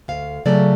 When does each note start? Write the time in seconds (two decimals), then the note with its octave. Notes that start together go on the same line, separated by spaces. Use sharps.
0.08 D2 F5
0.46 C#3 F#3 A3 D5